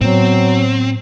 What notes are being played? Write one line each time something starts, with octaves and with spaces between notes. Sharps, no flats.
A2 F#3 B3 C4